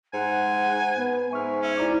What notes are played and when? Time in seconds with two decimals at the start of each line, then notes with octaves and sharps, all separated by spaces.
0.13 G#2 F#5 G#5
0.96 B3
1.31 G#2 E5 G#5 C#6 F6
1.62 C#4 E5
1.77 E4 D5 A#5 D6